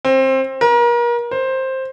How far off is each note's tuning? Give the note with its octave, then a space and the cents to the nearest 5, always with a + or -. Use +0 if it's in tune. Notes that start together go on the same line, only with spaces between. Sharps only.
C4 +20
A#4 +35
C5 +10